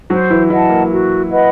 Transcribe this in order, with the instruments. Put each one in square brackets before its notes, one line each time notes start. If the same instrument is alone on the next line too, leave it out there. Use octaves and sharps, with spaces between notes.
[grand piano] F#3 F#4 [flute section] C5
[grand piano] E3 E4
[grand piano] E3 E4 [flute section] D#5 F#5 A5
[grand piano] A#3
[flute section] F#4
B4 D#5 F#5